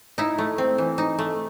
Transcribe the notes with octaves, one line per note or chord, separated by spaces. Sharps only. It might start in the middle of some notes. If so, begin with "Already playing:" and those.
D#4 E4
A3
C4
E3
D#4
A3